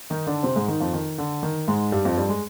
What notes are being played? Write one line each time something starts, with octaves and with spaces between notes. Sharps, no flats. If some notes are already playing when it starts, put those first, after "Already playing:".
D#3 D#4
D3 D4
C3 C4
G#2 G#3
D#3 D#4
F2 F3
D#3
D3
D#3
G#2 G#3
G2 G3
F2 F3
G2 G3
G#3